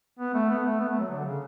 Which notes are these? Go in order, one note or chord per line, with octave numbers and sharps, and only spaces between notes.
B3
A3
B3
A3
B3
A3
F#3
D3
C#3